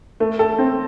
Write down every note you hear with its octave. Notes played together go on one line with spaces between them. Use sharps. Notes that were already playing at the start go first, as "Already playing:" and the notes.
A3
A4
C4